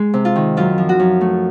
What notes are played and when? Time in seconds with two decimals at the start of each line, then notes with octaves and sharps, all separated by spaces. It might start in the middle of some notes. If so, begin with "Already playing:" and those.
Already playing: G#3
0.14 C3
0.25 F4
0.36 D#3
0.57 F#2 F4
0.78 F3
0.89 F#4
1.00 F#2
1.21 A3